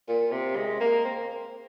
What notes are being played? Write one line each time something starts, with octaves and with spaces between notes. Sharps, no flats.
A#2
C3
G#3
A#3
C4